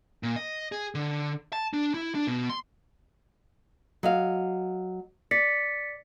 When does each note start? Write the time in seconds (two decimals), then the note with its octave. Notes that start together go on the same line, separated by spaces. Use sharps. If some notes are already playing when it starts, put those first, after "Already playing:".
0.23 A#2
0.36 D#5
0.72 G#4
0.95 D3
1.53 A5
1.73 D4
1.94 E4
2.15 D4
2.27 B2
2.50 C6
4.03 F#3 D#5 F5
5.31 D5 A6 B6 C#7